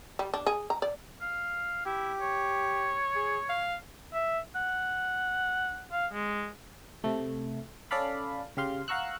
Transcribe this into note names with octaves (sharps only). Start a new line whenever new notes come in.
G3
D4
G#4
A#5
D5
F5
E4 G4
C#5
G#4
F5
E5
F#5
F5
G#3
C3 A3
C#4 A4 D5 F5 B5
C#3 G4 F5 C6
F5 F#5 A#5 C#6 E6 F#6